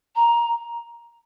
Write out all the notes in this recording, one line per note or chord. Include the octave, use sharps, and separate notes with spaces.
A#5